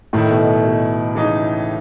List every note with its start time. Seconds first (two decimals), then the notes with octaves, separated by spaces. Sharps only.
0.13 A2 D#3 A3 E4
0.31 B2
0.65 B2
1.15 C#3 E3 G#3 D#4